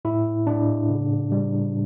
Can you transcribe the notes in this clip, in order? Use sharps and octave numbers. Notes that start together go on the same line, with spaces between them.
A2 E4
A2 D4
C#3
G3